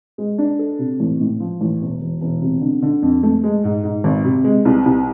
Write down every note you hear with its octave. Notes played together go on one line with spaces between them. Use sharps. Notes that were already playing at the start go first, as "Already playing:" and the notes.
G#3
D4
A4
C3
A1
A2
F3
A1
E1
E1
E1
C3
D3
D3
F2
A3
G#3
G#2
G#2
G#1
C3
G#3
C2
C2